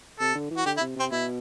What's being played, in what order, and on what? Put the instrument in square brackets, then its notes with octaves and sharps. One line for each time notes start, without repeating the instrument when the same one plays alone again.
[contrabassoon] C3 [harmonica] A4
[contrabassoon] D3
E3
[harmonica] F#4
[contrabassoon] D3 [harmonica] G4
[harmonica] E4
[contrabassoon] C3
[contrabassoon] C3 [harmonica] C4
[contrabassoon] B2 [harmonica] E4